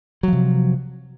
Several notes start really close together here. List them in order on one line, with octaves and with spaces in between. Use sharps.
F#3 F3 C3